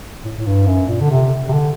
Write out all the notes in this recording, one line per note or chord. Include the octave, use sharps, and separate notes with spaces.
A2
A2
G2
F#2
A#2
D3
C3
C3
D3